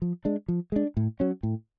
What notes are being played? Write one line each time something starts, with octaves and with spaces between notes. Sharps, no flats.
F3
G#3 D4
F3
G#3 D4
A2
F#3 C#4
A2